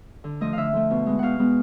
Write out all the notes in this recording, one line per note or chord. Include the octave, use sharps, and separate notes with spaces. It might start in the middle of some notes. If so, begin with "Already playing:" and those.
D3
F3 A3 D#5
D3 E5 F5
F3 A3
B2
G#3 B3
B2 F5 F#5
G#3 B3